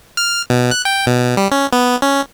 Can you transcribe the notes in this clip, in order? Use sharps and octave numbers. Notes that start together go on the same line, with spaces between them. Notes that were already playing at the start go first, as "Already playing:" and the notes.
F6
B2
F#6
G5
B2
G3
C#4
B3
C#4